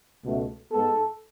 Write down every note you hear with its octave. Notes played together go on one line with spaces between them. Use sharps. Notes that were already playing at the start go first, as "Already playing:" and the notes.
C#2 B2 A3
G#2 G#3 B3 A4